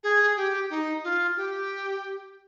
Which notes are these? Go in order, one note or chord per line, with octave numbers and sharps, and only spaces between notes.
G#4
G4
D#4
F4
G4